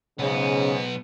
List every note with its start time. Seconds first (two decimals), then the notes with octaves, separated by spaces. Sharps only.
0.19 B1 G#2 C#3 B3